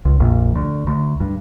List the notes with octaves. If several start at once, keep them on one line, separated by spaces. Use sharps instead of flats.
C#2
A#1 F2 A#2
D2
D2
G2